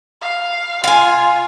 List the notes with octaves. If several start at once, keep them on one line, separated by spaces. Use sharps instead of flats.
F5
F4 F5 G#5